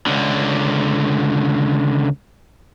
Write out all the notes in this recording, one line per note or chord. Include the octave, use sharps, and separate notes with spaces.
C#2 D3